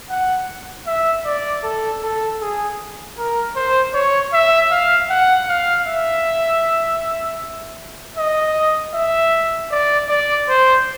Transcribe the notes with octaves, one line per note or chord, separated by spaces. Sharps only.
F#5
E5
D5
A4
A4
G#4
A#4
C5
C#5
E5
F5
F#5
F5
E5
D#5
E5
D5
D5
C5